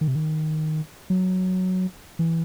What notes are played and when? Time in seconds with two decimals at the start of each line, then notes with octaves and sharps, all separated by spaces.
0.01 D#3
0.08 C3
0.15 D#3
1.10 F#3
2.19 E3